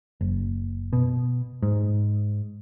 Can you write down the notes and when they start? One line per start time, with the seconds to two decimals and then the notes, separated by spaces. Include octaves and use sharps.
0.21 F#1
0.93 B2
1.62 G#2